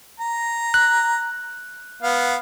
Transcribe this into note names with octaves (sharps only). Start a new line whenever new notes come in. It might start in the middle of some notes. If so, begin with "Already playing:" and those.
A#5
F#6
B3 F5